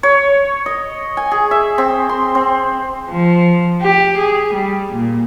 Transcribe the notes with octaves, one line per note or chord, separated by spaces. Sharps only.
C#5
D#5
G#5
G#4
E5
C4
C6
C4
F3
G4
G#4
G3
A#2